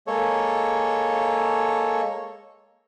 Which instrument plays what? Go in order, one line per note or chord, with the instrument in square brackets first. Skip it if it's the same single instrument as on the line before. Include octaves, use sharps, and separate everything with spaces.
[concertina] G#3 A#3 A4 C#5